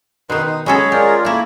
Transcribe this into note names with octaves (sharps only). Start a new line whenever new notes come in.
B2 D#3 D#4 B4 C6
D#4
F#3 G#3 C#4 G#4 A4 C#5 B5
F4 G4 A#4 D5
A3 A#3 E4 B5